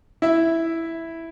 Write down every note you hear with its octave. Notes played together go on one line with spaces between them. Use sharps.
E4 E5